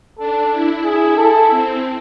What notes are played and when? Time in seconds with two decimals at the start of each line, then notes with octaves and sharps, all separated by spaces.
0.18 D4 A4
0.51 E4
0.84 E4 G#4
1.17 A4
1.50 C4